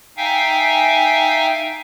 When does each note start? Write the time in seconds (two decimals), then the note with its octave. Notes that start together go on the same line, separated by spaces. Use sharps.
0.17 D#4 E5 F5 G5 G#5